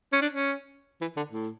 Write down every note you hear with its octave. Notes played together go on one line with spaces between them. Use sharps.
C#4
D4
C#4
E3
D3
A2